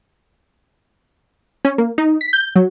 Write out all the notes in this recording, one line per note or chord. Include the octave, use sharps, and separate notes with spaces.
C#4
A#3
D#4
B6
G6
F#3